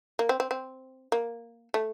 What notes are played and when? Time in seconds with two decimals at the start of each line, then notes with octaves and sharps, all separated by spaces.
0.19 A#3
0.29 C4
0.40 C4
0.51 C4
1.12 A#3
1.74 A3